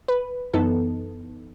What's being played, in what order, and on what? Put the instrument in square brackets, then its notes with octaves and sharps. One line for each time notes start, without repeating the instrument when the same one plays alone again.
[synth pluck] B4
F#2 E3 B3 D#4 A4